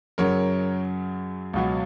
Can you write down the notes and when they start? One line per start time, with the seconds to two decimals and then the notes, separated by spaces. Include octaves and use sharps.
0.18 F#2 C#3 F#3 A#4 C#5
1.53 C#2 B2 F#3